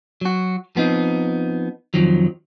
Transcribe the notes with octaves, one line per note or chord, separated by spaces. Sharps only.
F#3 F#4
F3 B3 C4 D#4
F2 D#3 F3 F#3